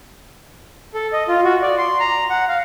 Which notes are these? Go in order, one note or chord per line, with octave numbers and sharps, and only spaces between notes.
A4
D#5
F4
F#4
D5
C6
A#5
F#5
F5